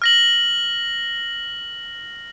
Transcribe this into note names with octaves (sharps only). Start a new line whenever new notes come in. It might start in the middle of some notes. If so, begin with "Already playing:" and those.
F6 A#6 F#7